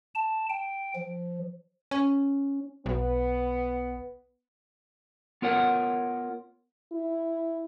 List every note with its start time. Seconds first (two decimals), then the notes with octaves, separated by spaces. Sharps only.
0.15 A5
0.50 G5
0.96 F3
1.91 C#4
2.86 B1 B3
5.42 B3 F4 A#4 C#5 F#5
6.92 E4